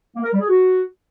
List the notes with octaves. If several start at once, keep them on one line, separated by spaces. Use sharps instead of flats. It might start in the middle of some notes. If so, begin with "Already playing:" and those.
A#3
A#4
G3
G#4
F#4